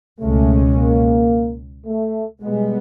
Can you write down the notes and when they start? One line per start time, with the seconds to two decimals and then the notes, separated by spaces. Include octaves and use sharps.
0.20 C#2 B2 G#3 A3 C#4
0.76 A#3
1.86 A3
2.41 B2 G3 G#3 B3